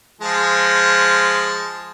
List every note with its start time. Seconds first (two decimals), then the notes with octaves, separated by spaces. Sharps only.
0.21 F3 G#3 A5